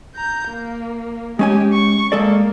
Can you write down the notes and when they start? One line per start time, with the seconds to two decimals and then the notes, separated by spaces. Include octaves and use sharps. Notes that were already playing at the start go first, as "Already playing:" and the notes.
0.16 A#5 G6
0.49 A#3
1.39 G#3 C#4 G4 G#5
1.73 C#6
2.12 G#3 A#3 A4 D5